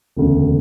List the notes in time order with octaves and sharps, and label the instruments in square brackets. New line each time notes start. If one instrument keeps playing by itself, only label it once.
[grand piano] E1 D2 C#3